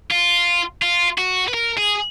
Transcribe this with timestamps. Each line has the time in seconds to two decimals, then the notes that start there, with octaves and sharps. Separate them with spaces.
0.11 F4
0.82 F4
1.18 F#4
1.48 B4
1.54 A#4
1.78 G#4